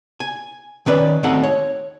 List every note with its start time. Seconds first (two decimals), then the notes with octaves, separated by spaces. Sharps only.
0.20 G#5
0.86 D#3 C#4 B4 D5
1.23 D#2 A3 C4 D#4 F#4 F#5
1.43 C#5